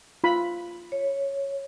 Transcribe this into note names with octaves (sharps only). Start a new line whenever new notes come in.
F4 B5
C#5